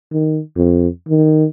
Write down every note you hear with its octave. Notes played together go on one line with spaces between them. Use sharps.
D#3
F2
D#3